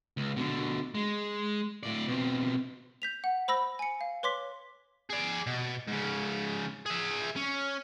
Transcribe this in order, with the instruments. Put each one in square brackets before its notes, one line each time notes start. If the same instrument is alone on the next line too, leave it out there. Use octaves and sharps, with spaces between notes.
[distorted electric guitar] C#2
B2 D3
G#3
A2 D5
B2 C4
[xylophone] G6 B6 F7
F#5
C5 B5 E6 A#6
G#5 C#7
F5
B4 C#5 C6 D6 B6
[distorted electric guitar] G#4 D5
B2
G#2 C#3
G#4 E5
C#4